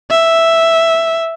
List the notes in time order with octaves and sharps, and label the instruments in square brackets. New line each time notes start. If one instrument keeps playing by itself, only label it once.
[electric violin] E5